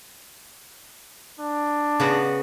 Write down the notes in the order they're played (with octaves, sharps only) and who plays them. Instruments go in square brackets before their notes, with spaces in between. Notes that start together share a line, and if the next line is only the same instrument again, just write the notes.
[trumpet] D4
[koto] C#3 B3 F#4